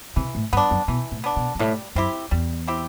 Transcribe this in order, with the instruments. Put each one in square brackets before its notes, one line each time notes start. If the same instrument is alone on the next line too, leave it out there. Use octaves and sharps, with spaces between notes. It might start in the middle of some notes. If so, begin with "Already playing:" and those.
[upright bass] C3 [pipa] E3
[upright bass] A2
[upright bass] G2 [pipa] B3 D4
[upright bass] F#2
[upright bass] B2 [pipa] E3
[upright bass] A2
[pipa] B3 D4
[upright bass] B2
G2
[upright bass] A2 [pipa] G3
[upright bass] F#2 [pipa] C4 E4 G4
[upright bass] E2 [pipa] G3
[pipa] C4 E4 G4